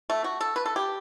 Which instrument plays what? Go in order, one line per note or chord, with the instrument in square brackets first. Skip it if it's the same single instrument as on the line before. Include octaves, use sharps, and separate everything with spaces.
[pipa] A3
F#4
A4
B4
A4
G4